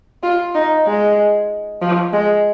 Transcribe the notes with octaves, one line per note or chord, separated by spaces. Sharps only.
F4
D#4
G#3
F3
G#3